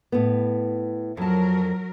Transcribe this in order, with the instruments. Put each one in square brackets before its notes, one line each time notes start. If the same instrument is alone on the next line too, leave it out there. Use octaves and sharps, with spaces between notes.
[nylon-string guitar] A2 B3
[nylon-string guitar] F2 A5 [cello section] F#3 A#4